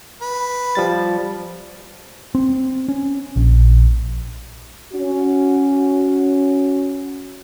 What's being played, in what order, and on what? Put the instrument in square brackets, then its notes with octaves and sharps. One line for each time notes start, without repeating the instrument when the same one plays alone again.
[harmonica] B4
[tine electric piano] F3 G3 A6
[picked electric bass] C4
C#4
A#1
[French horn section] C#4 F#4